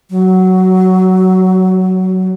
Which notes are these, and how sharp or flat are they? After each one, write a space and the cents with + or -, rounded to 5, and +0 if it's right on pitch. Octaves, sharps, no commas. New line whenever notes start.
F#3 +10